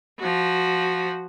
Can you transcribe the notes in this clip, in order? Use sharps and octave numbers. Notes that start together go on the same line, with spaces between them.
F3 F#4